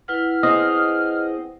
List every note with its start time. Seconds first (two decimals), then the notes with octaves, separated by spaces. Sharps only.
0.08 E4 B4 F#5 F6
0.43 C4 G#4 D#5